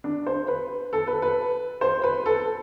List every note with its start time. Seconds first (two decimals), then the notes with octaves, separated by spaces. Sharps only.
0.04 D4
0.26 C5
0.48 B4
0.93 A4
1.07 B4
1.22 B4
1.81 C5
2.03 B4
2.26 A4